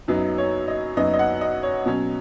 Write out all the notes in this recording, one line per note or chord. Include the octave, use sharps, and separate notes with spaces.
F#2 F#3 B3 D#4
C#5
D#5
F#2 F#3 B3 D#4 D#5
D#5
F#5
D#5
C#5
B2 F#3 C#4